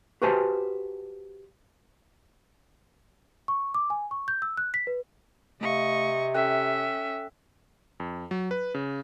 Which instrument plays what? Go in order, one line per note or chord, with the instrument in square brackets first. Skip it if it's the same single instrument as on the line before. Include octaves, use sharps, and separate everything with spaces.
[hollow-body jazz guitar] F#4 G4 B4 C5 G#5 A5
[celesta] C#6
D6
G#5
C#6
G6
E6
F#6
B6
B4
[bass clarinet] C3 [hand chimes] A3 F5 [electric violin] D#5 C#6
[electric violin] C#4 E5 [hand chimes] A4 G5 F#6
[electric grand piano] F2
F#3
B4
C#3